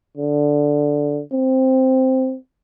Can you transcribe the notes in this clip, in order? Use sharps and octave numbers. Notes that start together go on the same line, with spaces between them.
D3
C4